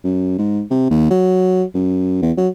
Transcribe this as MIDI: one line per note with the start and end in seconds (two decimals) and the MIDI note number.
0.04 0.34 42
0.39 0.62 44
0.71 0.90 48
0.90 1.10 39
1.11 1.64 54
1.75 2.19 42
2.22 2.32 40
2.38 2.49 54